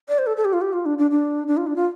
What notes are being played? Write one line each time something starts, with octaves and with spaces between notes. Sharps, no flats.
D5
C5
A4
A4
G4
F4
G4
F4
D4
D4
D4
D4
F4
D4
F4